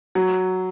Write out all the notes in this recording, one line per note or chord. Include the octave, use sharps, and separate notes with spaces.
F#3